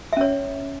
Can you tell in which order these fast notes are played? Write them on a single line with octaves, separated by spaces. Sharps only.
E5 C#4 C#5